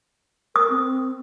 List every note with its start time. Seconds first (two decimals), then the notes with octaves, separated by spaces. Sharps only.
0.56 A#4 D#6
0.70 C4